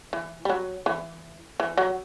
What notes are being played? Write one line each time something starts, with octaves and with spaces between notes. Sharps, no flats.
E3
G3
F#3
E3
E3
F#3